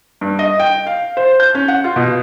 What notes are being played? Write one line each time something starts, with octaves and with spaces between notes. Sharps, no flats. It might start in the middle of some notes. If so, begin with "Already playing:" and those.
G2
D#5
G5
F5
C5
G6
C#4
F#5
F4
B2